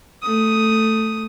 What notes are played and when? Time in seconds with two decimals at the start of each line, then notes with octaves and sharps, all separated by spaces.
0.22 A3 D#6